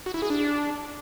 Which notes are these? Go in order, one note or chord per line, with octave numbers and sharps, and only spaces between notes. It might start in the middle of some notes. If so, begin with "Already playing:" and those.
F#4
E4
G#4
D4